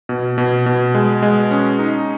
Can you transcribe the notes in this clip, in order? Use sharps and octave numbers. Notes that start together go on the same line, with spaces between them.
B2
B2
B2
G#3
G#3
C#4
D#4